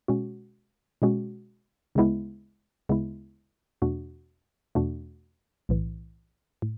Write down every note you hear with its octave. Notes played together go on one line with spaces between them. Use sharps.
B2 G#3 C#4 F#4
B2 G#3 C#4 F#4
D2 C#3 G#3 B3 E4
D2 C#3 G#3 B3 E4
E2 B2 A3 D4 F#4
E2 B2 A3 D4 F#4
B1 A2 E3
A2